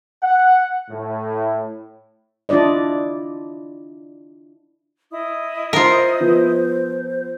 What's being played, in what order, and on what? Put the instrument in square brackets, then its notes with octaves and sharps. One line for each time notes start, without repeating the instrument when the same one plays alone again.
[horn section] F#5
A2
[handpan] D4 E4 F4 D5 D#5
[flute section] E4 D#5 D#6
[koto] F4 A#4 [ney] C5
[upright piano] F3 B3